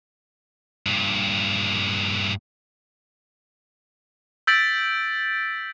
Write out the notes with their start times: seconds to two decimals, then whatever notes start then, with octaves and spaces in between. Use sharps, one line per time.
0.87 G2 A#2
4.47 E6 G6 A6 B6 D7 F#7